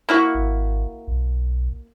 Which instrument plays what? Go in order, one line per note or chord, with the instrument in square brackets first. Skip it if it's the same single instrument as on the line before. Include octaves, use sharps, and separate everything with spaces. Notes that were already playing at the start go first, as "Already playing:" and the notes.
[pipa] A#3 E4 F#4
[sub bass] G#1
B1